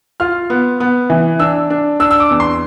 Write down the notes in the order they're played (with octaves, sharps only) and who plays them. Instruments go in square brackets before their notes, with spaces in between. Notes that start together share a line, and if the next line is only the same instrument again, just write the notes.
[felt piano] F4 [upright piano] F6
[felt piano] B3
B3
E3
[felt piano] D4 [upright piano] E6
[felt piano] D4
[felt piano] D4 [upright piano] E6
[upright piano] E6
D6
[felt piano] E2
[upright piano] C6